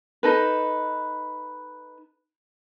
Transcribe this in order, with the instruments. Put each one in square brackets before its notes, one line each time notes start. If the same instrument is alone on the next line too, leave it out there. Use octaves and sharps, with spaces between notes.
[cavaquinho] D#4 A4 B4